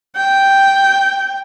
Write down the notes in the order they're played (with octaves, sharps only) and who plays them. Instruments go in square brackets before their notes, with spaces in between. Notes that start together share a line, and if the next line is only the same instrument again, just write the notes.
[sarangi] G5